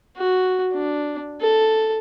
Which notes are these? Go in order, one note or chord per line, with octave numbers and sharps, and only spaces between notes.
F#4
D4
A4